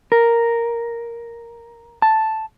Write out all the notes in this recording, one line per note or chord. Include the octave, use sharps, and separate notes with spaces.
A#4
A5